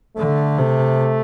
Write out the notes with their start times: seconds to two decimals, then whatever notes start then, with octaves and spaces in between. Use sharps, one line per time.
0.17 D3 A3
0.58 C3